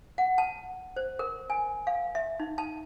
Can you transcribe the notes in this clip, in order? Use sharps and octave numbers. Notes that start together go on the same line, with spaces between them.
F#5
A5
C5
A#4
G#5
F5
E5
D#4
A5